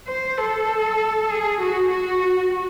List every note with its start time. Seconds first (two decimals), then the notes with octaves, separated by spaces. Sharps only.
0.08 C5
0.38 A4
1.31 G#4
1.61 F#4
1.91 F#4